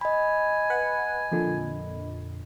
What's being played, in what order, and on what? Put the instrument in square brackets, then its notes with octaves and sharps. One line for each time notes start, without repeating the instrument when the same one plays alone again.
[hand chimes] D#5 B5 [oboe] G#5
[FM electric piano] B4 F#5
F2 A#2 D3